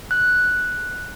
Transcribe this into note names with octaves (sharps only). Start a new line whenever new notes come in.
F#6